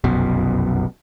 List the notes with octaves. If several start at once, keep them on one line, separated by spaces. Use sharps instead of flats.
F1 B1 F#2 B2